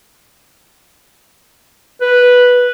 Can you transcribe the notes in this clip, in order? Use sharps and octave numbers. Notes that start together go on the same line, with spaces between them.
B4